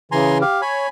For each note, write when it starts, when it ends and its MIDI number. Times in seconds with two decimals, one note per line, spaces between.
0.12 0.43 49
0.12 0.43 52
0.12 0.38 80
0.12 0.38 82
0.12 0.38 84
0.41 0.61 67
0.41 0.61 77
0.62 0.87 73
0.62 0.89 80
0.62 0.89 83